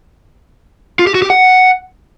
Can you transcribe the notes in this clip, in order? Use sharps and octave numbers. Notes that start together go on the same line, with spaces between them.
F4
G4
F#4
G4
F#5